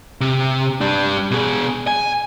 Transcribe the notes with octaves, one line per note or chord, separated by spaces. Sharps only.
C3
G3 D4
B2 G#4
G#5